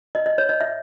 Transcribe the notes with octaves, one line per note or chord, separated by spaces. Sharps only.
D#5
D#5
C#5
D#5
E5